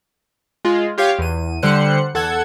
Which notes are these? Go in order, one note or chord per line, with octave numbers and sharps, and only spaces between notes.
G#3 F4
F4 G4 C#5 F5
E2 D#7
D3 G3 C5 F#6 C#7
E2 A4 F#5 G#6